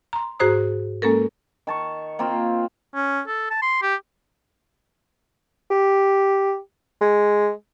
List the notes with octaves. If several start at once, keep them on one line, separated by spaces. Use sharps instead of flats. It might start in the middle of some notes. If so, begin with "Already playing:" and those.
A#5 C6
G#2 F#4 G#4 C5 A#5 D#6
G#3 A#3 C#4 A4 A#4
D#3 A5 C#6
A#3 C4 F4
C#4
A4
A5
C6
G4
G4
G#3